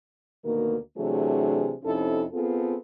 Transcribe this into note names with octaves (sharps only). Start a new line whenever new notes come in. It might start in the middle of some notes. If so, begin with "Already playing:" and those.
D2 B2 D#3 A#3 A#4
C3 E3 F#3 A3 D4 G#4
F2 C3 C#4 D#4 E4 A4
B3 C4 F4 G#4 A4